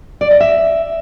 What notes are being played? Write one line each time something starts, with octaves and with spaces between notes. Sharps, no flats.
D5
D#5
E5